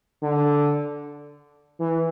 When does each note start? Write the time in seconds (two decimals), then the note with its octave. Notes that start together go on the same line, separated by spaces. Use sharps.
0.22 D3
1.79 E3